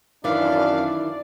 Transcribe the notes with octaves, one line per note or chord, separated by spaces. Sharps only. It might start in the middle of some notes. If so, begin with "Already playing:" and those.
F#2 D#3 E3 D4 D5 F5